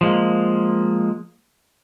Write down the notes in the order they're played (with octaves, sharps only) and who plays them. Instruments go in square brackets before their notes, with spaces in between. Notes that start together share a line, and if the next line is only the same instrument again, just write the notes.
[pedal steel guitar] F3 G#3 A#3